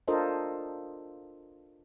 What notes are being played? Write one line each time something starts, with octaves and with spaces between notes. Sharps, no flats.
D4 F4 A4 A#4 C5 D#5